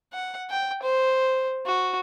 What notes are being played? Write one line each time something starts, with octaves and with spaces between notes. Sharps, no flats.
F#5
G5
C5
F#4